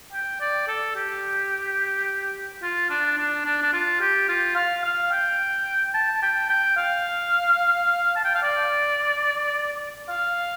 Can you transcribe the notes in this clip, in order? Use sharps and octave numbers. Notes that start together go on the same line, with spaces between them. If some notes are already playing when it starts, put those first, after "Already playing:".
G5
D5
A4
G4
F4
D4
D4
D4
D4
F4
G4
F4
F5
F5
G5
A5
G5
G5
F5
A5
G5
F5
D5
F5